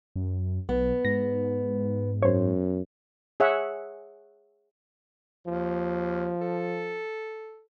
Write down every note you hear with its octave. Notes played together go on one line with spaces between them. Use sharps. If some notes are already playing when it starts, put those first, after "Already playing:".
F#2
B1 B3
G#2 A#6
F#2 C5 C#5
G#4 C#5 E5 F#5
D#2 F3
A4